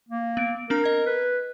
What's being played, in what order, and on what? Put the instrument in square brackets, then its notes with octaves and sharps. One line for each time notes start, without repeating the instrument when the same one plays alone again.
[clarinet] A#3
[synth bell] B3 D7
[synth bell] C4 D4 A#5 [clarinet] A#4
[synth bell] D#5 G#6
[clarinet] B4